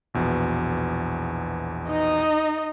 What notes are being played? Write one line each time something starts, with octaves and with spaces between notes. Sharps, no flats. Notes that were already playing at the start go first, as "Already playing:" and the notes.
A#1 E2 B2
D#4 D#5